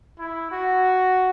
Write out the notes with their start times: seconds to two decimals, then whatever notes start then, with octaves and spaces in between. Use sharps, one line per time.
0.19 E4
0.51 F#4